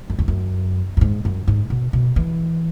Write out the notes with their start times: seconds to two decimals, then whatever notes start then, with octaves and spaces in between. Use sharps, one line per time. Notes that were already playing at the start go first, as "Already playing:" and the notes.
0.10 F#2
0.19 E2
0.28 F#2
0.97 F#2
1.01 G#2
1.25 F#2
1.48 G#2
1.70 B2
1.93 B2
2.16 E3